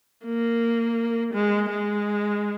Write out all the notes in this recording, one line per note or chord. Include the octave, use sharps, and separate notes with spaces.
A#3
G#3
G#3